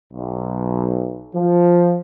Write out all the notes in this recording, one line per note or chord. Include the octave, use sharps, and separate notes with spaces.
B1
F3